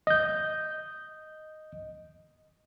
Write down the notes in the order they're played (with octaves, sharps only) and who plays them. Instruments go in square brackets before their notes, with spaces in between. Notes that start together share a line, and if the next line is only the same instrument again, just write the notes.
[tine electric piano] D#5 G6